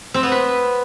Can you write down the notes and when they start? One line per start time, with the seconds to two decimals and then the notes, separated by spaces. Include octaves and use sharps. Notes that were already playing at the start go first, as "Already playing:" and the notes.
0.14 C4
0.23 B3
0.32 B4